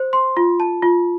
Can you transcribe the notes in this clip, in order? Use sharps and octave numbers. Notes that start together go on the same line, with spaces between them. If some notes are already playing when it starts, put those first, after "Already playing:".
Already playing: C5
C6
F4
A5
F4